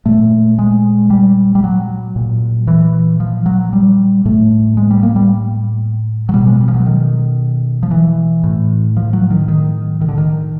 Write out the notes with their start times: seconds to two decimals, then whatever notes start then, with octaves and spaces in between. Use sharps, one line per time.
0.06 A#2 A3
0.59 G#3
1.10 G3
1.55 G3
1.64 F#3
2.16 A#2
2.67 E3
3.20 F3
3.46 F#3
3.73 G3
4.25 A2 A3
4.77 G#3
4.91 G3
5.03 A#3
5.16 G3
6.29 F#3
6.34 B2 G3
6.47 G#3
6.61 G3
6.68 F3
6.74 F#3
6.86 D#3
7.83 F3
7.91 E3
8.44 A2
8.97 F3
9.13 F#3
9.31 D#3
9.48 D#3
10.01 D#3
10.09 D3
10.18 D#3